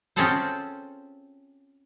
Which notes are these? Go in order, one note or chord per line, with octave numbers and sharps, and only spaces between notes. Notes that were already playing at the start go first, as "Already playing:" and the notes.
C4 C#4 F4 G#4 A4 C5